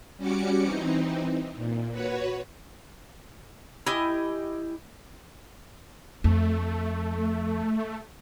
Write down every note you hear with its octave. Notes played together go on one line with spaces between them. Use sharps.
G3 C#4 F#4 D6 C#7
E3 C4 D#4
A#2
F#4 B4 C#5
E4 G4 D#5 G#5
F2 A3